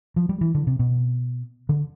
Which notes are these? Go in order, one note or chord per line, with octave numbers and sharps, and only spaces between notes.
F3
G3
E3
D3
C3
B2
D3